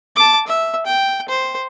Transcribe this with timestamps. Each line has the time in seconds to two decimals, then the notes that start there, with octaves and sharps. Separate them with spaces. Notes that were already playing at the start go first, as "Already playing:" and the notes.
0.16 A5 D6
0.47 E5
0.86 G5
1.29 C5